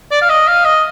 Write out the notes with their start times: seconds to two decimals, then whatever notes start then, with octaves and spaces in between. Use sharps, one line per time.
0.11 D5
0.22 F5
0.30 D#5
0.48 F5
0.65 D#5